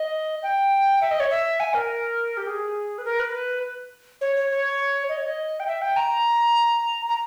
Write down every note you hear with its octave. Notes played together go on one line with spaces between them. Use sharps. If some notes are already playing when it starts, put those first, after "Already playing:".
Already playing: D#5
G5
E5
D#5
C#5
E5
G#5
A#4
G4
G#4
B4
A#4
B4
C#5
C#5
C#5
D#5
C#5
D#5
G5
E5
G5
A#5
A#5